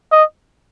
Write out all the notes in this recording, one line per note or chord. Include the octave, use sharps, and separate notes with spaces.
D#5